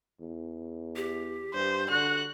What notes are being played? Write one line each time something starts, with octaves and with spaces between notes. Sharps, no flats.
E2
G4
G2 C5
D3 F#4 F#6